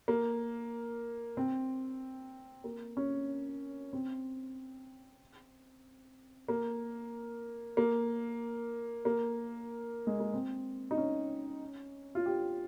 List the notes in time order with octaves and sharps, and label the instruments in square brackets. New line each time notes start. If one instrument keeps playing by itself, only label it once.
[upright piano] A#3
C4
A#3
C#4
C4
A#3
A#3
A#3
G#3
A#3
C4
D#4
C#4
F4
G4